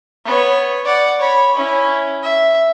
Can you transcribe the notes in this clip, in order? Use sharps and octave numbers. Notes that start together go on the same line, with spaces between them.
B3 C#5
D5 F#5
C#5 B5
C#4 E4
E5